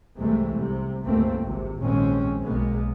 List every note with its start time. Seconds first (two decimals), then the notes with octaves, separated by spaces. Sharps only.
0.19 C2 G#2 C3 E3 G#3 A3
0.53 C2 C3
1.03 G1 C#2 G#2 A3 A#3 C4
1.42 G#1 C3
1.80 A#1 D#2 G#2 G#3 C4 C#4
2.44 B1 B2 G#3 A#3 B3